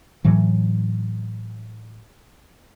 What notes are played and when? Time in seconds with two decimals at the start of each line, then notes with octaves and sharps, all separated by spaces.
0.25 A2 E3 F#3